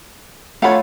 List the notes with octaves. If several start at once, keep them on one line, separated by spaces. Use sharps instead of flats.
A3 F4 C#5 F5 F#5 B5